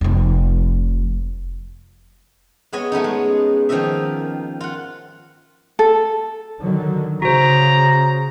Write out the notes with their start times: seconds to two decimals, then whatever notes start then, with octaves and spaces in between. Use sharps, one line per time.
0.01 F1 F3
2.73 G#3 B3 C#5 D#5 G#5
2.92 A3 B3 C#4 D#4
3.04 G#3
3.69 D#3 F3 A#3 C#4 D#5 E5
4.61 F4 F#5
5.79 A4
6.62 D3 D#3 F#3
7.22 C#3 F#4 C5 A#5